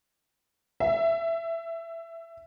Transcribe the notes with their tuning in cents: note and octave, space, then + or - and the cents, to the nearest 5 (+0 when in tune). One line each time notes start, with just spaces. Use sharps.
E5 +15